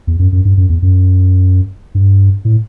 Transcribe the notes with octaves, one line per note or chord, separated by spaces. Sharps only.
E2
F#2
F#2
G2
F#2
E2
F#2
G2
A2